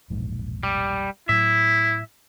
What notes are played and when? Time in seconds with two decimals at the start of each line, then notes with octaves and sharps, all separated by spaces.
0.10 E1 A#1 G#2
0.63 G3
1.29 A2 F#3 E4 E5